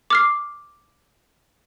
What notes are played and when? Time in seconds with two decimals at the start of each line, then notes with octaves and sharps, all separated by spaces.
0.10 D6 F6 C7